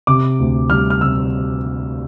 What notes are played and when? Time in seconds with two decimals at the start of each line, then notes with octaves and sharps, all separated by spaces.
0.07 C3 D6
0.39 D2
0.70 G3 F6
0.90 F6
1.01 C3 E6